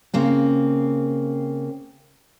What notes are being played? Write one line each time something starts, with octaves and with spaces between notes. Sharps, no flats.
C#3 A#3 C4